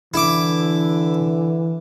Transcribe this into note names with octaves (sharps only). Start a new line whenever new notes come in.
D3 E3 E4 D6